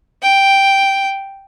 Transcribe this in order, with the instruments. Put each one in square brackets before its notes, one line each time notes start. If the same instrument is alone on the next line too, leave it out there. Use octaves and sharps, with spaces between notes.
[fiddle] G5